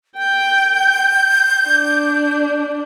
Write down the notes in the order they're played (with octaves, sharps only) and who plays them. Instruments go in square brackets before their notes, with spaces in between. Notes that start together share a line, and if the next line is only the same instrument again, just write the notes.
[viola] G5 [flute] G6
[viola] D4